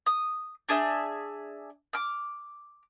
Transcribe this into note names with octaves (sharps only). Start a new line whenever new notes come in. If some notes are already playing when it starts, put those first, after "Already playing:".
D#6
D4 G#4 E5 G6
D6 F6